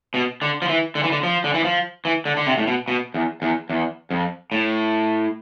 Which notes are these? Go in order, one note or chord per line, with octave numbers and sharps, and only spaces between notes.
B2
D3
F3
E3
D3
E3
D3
F3
D3
E3
F3
E3
D3
D3
C3
A2
B2
B2
E2
E2
E2
F2
A2